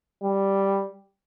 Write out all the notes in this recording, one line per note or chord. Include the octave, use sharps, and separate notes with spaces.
G3